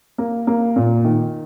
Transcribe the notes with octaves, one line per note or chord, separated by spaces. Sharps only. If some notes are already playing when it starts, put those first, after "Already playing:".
A#3
A#3
A#2
D#3